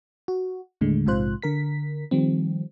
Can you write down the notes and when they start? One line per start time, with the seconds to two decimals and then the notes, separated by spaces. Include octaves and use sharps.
0.28 F#4
0.81 D#2 A2 D3 G#3
1.06 A#1 G#2 C3 F4 C5 F#6
1.42 D3 A#4 B6
2.11 D#3 F3 G3 C4